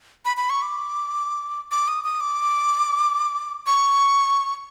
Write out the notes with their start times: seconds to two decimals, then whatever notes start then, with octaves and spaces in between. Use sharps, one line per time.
0.25 B5
0.37 B5
0.50 C#6
0.62 D6
1.71 D6
1.88 D#6
2.04 D#6
2.20 D6
3.66 C#6